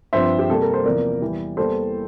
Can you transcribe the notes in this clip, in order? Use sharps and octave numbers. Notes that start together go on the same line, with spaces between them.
G2 F3 C4 C5 E5
G4
C3 G3 A#3 A4
A#4
C5
E2 C3 F3 A#3 A#4 D5
E2 E3 G3
E2 E3 G3 A#3 A4 C5